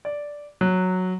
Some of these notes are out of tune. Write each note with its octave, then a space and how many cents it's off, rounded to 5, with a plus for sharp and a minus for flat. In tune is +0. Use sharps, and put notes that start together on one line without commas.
D5 -5
F#3 -5